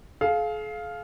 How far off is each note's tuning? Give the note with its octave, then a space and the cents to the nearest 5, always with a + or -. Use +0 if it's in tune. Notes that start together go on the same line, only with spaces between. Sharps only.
G#4 +45 F5 +0